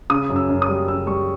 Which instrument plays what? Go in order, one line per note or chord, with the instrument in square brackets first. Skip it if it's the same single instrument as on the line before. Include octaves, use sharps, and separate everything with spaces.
[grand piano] C#3 D#6
F#2
E6
F#2
D#6
G3
C#3 E6
G3 C#6